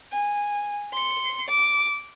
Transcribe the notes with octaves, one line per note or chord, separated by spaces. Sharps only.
G#5
C6 C#7
D6